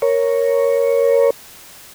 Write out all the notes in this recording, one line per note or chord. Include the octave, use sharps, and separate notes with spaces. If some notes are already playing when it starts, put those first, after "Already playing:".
A#4 C#5